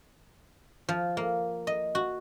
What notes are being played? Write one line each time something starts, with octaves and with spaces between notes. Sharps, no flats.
F3
A#3
D#5
F#4